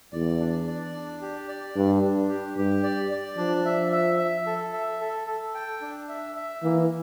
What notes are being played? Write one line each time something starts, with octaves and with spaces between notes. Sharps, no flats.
E2 D5
D4
D5
D4
G4
D5
G2 D4
D4
G4
G2 G4
D5
D5
F3 D4
E5
E5
E5
A4
E5
A4
A4
G5
D4
E5
E5
E3 A#3